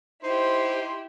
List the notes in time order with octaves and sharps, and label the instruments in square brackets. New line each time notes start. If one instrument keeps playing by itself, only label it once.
[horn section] D#4 C6 [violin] E4 G4 [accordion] C5